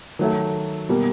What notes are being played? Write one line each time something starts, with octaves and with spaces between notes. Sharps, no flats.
D#3 F#3 A3
B2 G3 A#3